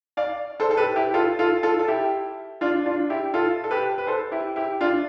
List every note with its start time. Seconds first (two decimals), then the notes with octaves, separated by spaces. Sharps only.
0.17 D5 F5
0.60 A4 C5
0.71 A4
0.77 G4 B4
0.96 E4 G4
1.14 F4 A4
1.39 F4 A4
1.63 F4 A4
1.79 A4
1.88 E4 G4
2.61 D4 F4
2.86 D4 F4
3.10 E4 G4
3.34 F4 A4
3.64 A4
3.71 G4 B4
3.98 B4
4.07 A4 C5
4.32 E4 G4
4.56 E4 G4
4.81 D4 F4